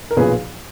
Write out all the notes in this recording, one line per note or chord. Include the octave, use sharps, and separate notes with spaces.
A#4
B1 A#2 F3 G#4 B4